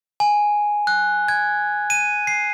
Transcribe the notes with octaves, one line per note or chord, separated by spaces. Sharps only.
G#5
F#6
G#6
D#7
C7